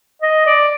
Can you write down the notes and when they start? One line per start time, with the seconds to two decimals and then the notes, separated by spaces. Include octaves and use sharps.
0.22 D#5
0.46 D5